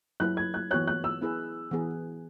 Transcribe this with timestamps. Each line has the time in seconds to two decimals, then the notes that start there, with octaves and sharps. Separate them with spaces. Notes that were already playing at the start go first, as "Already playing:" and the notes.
0.20 F#3 E4 B4 F#6
0.37 G#6
0.54 F#6
0.71 E3 B3 F#4 C#5 F#6
0.87 F#6
1.04 E6
1.21 B3 E4 G#4 B4
1.71 E3 B3 G#4